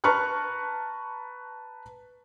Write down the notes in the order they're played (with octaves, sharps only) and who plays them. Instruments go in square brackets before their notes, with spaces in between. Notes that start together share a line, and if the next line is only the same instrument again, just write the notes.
[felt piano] B4 A5 A#5 C#6 F6 F#6